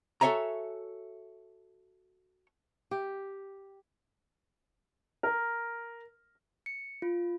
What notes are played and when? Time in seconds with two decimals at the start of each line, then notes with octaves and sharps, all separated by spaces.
0.21 F#4 A4 C#5 E5 G#5 A#5
2.91 G4
5.23 A#4
6.66 C#7
7.02 F4